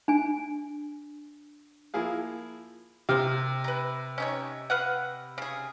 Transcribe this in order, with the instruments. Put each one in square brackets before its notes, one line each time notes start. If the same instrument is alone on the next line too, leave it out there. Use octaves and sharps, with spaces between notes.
[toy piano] D4 G#5
[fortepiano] F3 A#3 E4 G#4 F5
[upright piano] C3 [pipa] A#4 C5
[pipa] B4 A#5
C#4 D#4 C#5
B4 F5 F#5
C#3 G#4